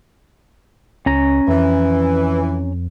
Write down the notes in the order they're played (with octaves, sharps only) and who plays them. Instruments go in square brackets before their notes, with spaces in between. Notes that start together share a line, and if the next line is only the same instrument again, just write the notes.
[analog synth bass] C#2 [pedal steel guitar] C#4 A#5
[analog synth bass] F2 [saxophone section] E3